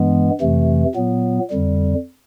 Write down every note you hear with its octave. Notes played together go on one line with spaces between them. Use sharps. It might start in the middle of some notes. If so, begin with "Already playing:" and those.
Already playing: G2 E3 G#3 B3
F2 C3 E3 A3
A#2 F#3 B3
F2 D3 G3